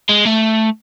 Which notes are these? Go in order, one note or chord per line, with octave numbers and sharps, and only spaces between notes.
G#3
A3